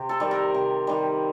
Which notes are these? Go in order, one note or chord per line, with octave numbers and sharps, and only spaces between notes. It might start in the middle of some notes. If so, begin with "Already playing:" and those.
Already playing: C3
A4
D#3 G3
A#4
C3
D#3 G3